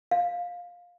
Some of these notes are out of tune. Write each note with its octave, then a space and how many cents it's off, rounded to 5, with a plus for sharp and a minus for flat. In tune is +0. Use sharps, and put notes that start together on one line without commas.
F5 +15